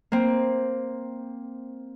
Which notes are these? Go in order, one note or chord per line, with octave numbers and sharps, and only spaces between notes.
A#3 C4